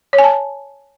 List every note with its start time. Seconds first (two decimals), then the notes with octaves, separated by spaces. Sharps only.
0.13 C#5
0.18 G#5
0.24 A5